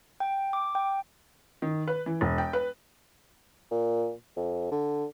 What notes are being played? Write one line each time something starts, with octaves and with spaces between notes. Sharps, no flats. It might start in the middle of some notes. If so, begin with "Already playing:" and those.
G5
D6
G5
D#3
B4
E3
E1
G5
B4
A#2
F2
D3